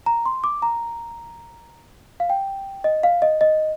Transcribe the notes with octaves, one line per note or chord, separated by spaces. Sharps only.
A#5
C6
D6
A#5
F5
G5
D#5
F5
D#5
D#5